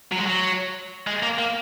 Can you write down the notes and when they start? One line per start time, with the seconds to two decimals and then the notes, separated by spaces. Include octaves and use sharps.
0.12 F#3
0.18 G#3
0.26 F#3
1.07 G#3
1.23 A#3
1.39 A#3